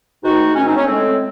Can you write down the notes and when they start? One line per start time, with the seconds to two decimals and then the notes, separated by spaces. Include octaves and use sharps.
0.23 G#2 D#3 A3 D#4 F#4
0.55 G#2 D#3 A3 C#4
0.65 C4 D#4
0.76 C#4
0.86 A2 G#3 C4